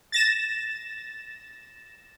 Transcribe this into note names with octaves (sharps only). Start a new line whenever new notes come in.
A6 A#6 E7